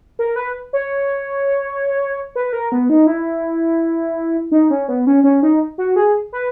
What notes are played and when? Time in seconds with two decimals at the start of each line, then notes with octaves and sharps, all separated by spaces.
0.19 A#4
0.36 B4
0.73 C#5
2.35 B4
2.53 A#4
2.72 B3
2.90 D#4
3.07 E4
4.52 D#4
4.70 C#4
4.88 B3
5.07 C#4
5.24 C#4
5.43 D#4
5.78 F#4
5.96 G#4
6.33 B4